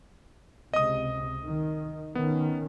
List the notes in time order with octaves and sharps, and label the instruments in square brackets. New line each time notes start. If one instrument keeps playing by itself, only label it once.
[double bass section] C#2 C3 [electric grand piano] D#5 D#6
[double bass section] D#3
[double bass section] D#3 C#4 [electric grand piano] B3